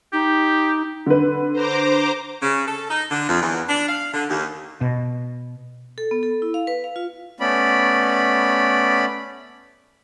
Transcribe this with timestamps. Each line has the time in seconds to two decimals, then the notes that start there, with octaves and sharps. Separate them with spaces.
0.13 D#4 G4
1.06 D3 B4
1.53 C5 A#5 D6
2.42 C#3
2.67 A4
2.90 D#4
3.11 D3
3.29 F2
3.41 E2
3.68 D4
3.88 F5
4.14 D3
4.30 D#2
4.81 B2
5.98 A4
6.11 B3
6.23 A4
6.42 E4
6.54 F5
6.67 B4
6.84 F5
6.96 F4
7.40 A3 B3 C#4 D5 B5